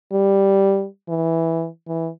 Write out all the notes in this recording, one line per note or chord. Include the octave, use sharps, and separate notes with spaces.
G3
E3
E3